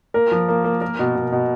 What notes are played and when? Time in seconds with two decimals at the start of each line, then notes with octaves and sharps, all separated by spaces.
0.14 A#3 A#4
0.31 F3
0.49 A#3
0.64 A#3
0.81 A#3 A#4
0.99 B2
1.16 B2
1.32 B2